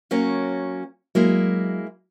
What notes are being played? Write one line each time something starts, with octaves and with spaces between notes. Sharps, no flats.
F#3 A#3 C#4
F#3 G#3 A#3 E4